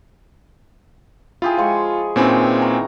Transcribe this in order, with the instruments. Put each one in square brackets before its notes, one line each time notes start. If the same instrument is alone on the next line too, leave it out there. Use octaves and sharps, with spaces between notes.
[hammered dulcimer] E4 G4 G#4 [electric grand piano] F4
[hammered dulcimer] F3 G#3 C#6
[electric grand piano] A#2 C4 [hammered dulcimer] D#3 E3 C#4
[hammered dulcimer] A#5